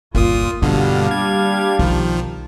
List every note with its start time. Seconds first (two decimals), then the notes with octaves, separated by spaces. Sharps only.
0.15 G1 D#2 A#2 A#3 F4 D#6
0.62 G2 B2 D3 G3 A#3 D4 F5
1.11 G#6
1.79 B1 D#3 F3